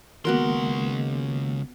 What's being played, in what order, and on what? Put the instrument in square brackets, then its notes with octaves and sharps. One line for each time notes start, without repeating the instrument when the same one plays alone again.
[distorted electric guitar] C#2 C6 [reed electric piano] D#3 G#3 A#3 [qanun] B3 F#4 A#4